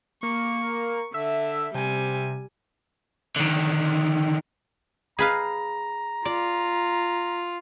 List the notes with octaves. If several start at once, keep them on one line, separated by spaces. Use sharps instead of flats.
A#3 C#6
D3 E5
C3 G3 G#5
D3 D#3
G#4 B4 F5 A#5
F4 D5